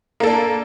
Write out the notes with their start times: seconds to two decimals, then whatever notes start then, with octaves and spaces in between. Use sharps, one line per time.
0.20 A#3
0.23 A4
0.27 D4